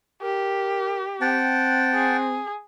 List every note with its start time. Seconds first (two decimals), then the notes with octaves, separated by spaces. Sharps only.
0.23 G4 A#4
1.21 C4 F#5 G5 A5
1.94 G#4